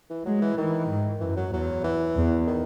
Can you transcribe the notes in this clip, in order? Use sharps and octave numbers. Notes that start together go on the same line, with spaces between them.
E3
F#3 G#3
E3
D#3 E3
G#2
F#2 E3
F#3
E2 F#3
E3
E2
D#3